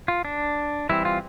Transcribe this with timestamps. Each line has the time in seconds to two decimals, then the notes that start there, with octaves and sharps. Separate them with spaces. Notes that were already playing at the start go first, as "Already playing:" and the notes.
0.08 F4
0.25 D4
0.89 E3 G3 C4 E4
1.05 F4